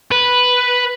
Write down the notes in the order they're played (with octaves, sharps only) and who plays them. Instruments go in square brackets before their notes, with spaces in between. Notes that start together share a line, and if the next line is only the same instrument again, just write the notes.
[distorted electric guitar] B4